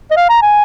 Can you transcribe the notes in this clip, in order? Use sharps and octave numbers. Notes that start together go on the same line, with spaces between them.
D#5
F5
A#5
G#5